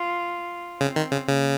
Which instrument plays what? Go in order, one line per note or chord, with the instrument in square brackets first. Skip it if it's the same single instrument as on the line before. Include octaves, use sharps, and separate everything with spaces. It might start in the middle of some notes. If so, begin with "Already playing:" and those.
Already playing: [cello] F4
[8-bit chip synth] C#3 [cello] C4
[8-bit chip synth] D#3
C#3
[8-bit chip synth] C#3 [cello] A#3